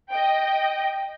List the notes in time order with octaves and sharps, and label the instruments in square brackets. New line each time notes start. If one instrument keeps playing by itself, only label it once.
[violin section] D#5 G5